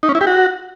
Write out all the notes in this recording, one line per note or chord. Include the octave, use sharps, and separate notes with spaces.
D#4
C#4
E4
G4
F#4